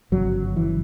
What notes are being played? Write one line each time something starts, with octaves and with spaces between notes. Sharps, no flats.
G1 F#2 C#3 F#3
E3